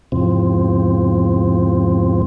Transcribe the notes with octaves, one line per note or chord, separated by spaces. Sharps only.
E2 G#2 C3 F3 C4